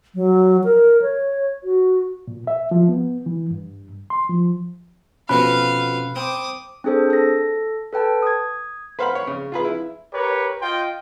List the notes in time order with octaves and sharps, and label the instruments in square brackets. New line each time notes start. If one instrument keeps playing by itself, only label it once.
[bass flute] F#3
A#4
C#5
F#4
[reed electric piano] A#2
E5
F3
B3
E3
G2
C6
F3
[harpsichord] F2 B3 F#4 [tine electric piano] B2 C#4 F#6 [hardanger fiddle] F5 [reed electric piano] B5
[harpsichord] C4 [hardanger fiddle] D6 D#6
[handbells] C4 D4 G#4 A4 C5
A4 A#6
A4 B4 G5 A5
D#6 G#6
[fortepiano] B4 C5 F5 F#5 B5
C#5
C#3
F4 G#4 B4
E4
[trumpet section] G4 A#4 B4 C#5
F4 D#5 G5 C6